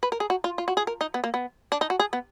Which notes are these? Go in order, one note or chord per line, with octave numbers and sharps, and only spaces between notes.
B4
A#4
G#4
F#4
F4
F4
F#4
G#4
A#4
D#4
B3
A#3
B3
D4
D#4
F#4
G#4
B3